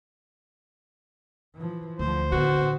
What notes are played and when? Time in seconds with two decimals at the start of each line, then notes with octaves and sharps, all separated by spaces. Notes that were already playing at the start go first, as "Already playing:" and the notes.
1.55 E3 F3
1.99 D2 D3 F3 C5
2.32 A2 D3 B3 F#4